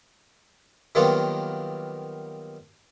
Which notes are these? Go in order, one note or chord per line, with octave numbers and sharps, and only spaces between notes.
D#3 F#3 G3 A#3 B3 F4